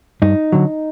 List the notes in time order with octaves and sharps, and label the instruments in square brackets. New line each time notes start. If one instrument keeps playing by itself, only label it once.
[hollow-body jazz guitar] G2 D#4
D3 F#3